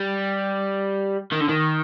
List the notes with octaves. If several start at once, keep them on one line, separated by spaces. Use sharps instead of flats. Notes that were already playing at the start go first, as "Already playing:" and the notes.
Already playing: G3
D#3
D3
D#3